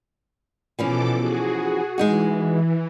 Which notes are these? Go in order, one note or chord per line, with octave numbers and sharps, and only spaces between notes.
B2 E3 F3 C#4 A4 D6
F#4 G#4
E3 G#3 D#4 F#4